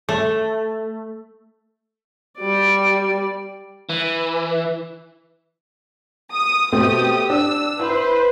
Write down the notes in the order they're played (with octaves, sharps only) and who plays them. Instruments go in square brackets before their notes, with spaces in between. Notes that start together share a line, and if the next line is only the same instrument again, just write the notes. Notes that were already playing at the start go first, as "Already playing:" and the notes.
[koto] A3
[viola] G3 D5
[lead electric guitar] E3
[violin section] D#6
[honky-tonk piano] B2 A3 C4 [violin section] G4 D#6
[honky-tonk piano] D4 [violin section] E6
[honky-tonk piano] E4 [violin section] B4 C5